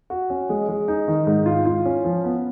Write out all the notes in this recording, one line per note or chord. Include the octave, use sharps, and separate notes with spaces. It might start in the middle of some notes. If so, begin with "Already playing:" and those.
F#4
C#4
G#3
G#3
D#4
D#3
G#2
F4
F4
C#4
F3
B3